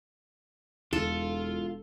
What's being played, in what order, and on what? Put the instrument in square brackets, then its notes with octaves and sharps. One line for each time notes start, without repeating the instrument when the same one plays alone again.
[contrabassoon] E1 [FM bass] E2 [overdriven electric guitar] F4 [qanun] A4